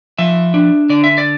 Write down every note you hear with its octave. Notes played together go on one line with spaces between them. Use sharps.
F3 E5
D4
D3 D5
E5
D5